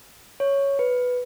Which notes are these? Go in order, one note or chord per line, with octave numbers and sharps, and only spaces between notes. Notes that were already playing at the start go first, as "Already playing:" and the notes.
C#5
B4